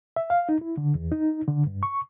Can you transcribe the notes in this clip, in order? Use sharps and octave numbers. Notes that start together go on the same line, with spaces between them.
E5
F5
D#4
E4
D3
E2
D#4
D3
G2
C#6